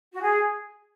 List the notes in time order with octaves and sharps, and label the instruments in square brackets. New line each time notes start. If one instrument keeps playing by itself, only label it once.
[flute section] F#4
G#4